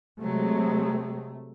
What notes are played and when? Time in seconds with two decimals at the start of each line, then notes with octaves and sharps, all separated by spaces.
0.21 C3 F#3 G#3 A3